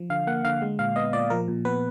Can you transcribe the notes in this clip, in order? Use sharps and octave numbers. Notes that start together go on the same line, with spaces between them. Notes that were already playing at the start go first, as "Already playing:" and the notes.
Already playing: F3
D3 F5
A#3 F#5
D3 F5
G#3
A#2 F5
B3 D#5
A#2 D5
F3 A#4
A#2
B3 B4